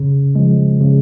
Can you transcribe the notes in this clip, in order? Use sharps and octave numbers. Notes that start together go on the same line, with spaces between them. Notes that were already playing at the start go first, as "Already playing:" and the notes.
Already playing: C#3
F3 G#3
C#3